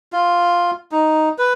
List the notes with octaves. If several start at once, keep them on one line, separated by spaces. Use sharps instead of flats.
F4
D#4
B4